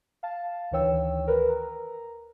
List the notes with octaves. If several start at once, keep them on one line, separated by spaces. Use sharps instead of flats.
F5 A5
D2 D#3 E3 C#5 G5 E6
A#4 B4
A#5